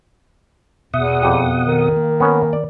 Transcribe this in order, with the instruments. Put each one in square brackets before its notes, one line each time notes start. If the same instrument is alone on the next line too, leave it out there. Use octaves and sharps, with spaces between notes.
[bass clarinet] E2 [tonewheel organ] B2 F#5 D#6 [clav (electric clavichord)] E5
[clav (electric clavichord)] F2 G4
[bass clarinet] D#3
[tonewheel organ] A#3
[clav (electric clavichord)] B3 C#4
D5